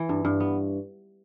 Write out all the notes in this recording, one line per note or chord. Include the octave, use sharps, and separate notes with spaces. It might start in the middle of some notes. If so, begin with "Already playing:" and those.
Already playing: E3
G2
G2
B3